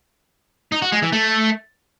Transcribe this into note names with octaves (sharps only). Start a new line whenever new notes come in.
D#4
F#4
G#3
E3
A3